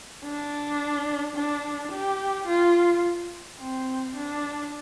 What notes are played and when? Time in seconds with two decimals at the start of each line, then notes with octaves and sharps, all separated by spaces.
0.24 D4
1.35 D4
1.92 G4
2.47 F4
3.59 C4
4.15 D4